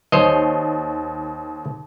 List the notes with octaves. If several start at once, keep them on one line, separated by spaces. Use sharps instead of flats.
D#2 C5 C#5 D#5